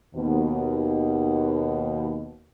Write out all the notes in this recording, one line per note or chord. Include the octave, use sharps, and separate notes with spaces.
D#2 B2